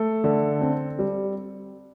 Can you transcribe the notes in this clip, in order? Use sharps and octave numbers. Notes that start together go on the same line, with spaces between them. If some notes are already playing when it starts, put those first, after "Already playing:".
Already playing: A3 A4
D3
C4
G3